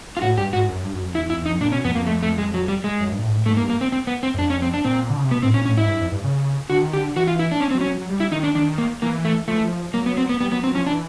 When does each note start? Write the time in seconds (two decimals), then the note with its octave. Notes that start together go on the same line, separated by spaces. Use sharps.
0.17 F4
0.22 A2 F#4
0.37 G2 G4
0.53 G#2 F#4
0.68 F#2
0.83 G2
0.93 F#2
1.04 F2
1.15 E2 E4
1.26 F2
1.30 E4
1.38 E2
1.46 D#4
1.50 F2
1.61 A#2 D4
1.72 B2 C#4
1.84 F2 B3
1.95 F2 A#3
2.07 A3
2.23 A3
2.38 G#3
2.54 F#3
2.68 G3
2.84 G#3
3.00 F#2
3.12 G2
3.18 A#2
3.23 A2
3.29 G#2
3.34 A2
3.46 G#2 A3
3.57 A#3
3.62 G2
3.70 A#3
3.81 C4
3.92 C4
4.07 B3
4.23 C4
4.34 F#2
4.39 F2 D4
4.50 C#4
4.62 C4
4.74 D4
4.85 A#2 C4
5.10 D3
5.17 C#3
5.24 C3
5.31 B2 B3
5.43 A2 C4
5.54 A#2 C#4
5.65 A2 C#4
5.77 G#2 E4
5.88 G2
6.01 F2
6.12 G2
6.24 C#3
6.70 D3 F#4
6.82 D#3
6.93 D3 G4
7.16 E3 F#4
7.27 F4
7.39 E4
7.52 D4
7.61 C#4
7.71 F#3 C4
7.81 C#4
7.86 F#3
7.98 F#3
8.09 G3
8.20 E4
8.32 D#3 D#4
8.43 D4
8.55 D#3 D4
8.78 A#3
9.02 E3 A#3
9.25 A3
9.48 F3 A3
9.56 E3
9.65 F3
9.94 F#3 A#3
10.06 B3
10.17 C4
10.29 B3
10.41 G3 B3
10.52 F#3 B3
10.63 F#3 C4
10.75 F3 C#4
10.87 E3 D4